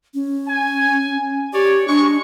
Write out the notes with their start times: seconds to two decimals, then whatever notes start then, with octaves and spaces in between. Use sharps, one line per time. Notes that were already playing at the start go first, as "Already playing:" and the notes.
0.14 C#4
0.48 G#5
1.53 G4 C#5 D5
1.88 G#3 D4 C#6